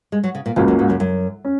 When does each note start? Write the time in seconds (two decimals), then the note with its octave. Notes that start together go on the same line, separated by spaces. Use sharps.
0.12 G#3
0.23 F#3
0.35 C#3
0.46 A#2
0.56 C#2 G#2 C#3 A#3 F#4
0.68 F#2
0.79 G#2
0.90 F#2
1.00 F#2
1.45 C#4